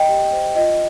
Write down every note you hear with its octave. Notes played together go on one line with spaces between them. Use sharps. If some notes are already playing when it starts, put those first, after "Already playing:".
Already playing: D#5 G5
G4
C5
F4 D#5